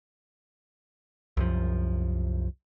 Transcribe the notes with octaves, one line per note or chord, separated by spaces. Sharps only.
C2 F#2 F3